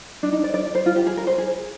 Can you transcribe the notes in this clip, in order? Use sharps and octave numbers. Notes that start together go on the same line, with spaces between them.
D4
D#4
D5
D5
C5
F4
G4
G#4
A#4
C5
G#4